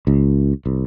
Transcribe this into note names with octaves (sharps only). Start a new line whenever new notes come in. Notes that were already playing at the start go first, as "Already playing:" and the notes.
C#2
C2